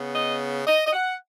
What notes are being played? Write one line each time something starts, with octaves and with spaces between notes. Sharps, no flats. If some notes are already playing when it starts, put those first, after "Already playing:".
Already playing: C#3 B3
D#5
D#5
D#5
F#5